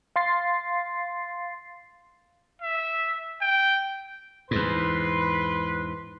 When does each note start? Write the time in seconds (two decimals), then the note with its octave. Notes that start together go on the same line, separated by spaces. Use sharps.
0.16 F5 C6 A6 C7
2.62 E5
3.42 G5
4.51 E2 G#2 B4 C6